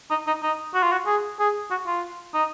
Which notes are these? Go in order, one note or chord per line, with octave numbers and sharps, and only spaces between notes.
D#4
D#4
D#4
F#4
F4
F#4
G#4
G#4
F#4
F4
D#4